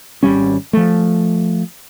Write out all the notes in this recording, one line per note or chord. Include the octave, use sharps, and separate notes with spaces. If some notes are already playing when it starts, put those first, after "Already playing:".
G#1 G3 C#4
F3 A3